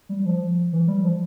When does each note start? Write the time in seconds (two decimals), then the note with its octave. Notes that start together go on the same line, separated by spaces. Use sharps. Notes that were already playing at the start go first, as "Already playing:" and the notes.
0.09 G3
0.19 G3
0.25 F3
0.73 E3
0.87 G3
1.03 F3